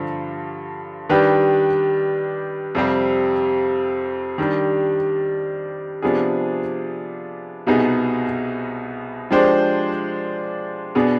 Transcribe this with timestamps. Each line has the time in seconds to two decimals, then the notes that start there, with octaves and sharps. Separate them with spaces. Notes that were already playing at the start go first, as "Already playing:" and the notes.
Already playing: G2 D3 F3
1.09 D#3 G3 D4 G4 B4
2.75 F2 C3 G3 C4
4.38 D#3 G3 D4
6.02 C3 F3 B3 D4 G#4
7.67 C2 B2 B3 D#4 G#4
9.31 F3 G#3 D4 G4 C5
10.95 B2 B3 D4 G#4